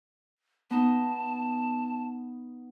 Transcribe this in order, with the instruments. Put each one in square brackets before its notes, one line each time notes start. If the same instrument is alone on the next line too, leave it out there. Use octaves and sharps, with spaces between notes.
[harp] B3 D#4 [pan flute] A5